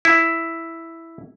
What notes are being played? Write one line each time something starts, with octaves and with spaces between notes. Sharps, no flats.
E4